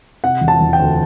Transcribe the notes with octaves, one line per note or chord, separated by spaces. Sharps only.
C3 F#5
E1
A5
E1
G5
D2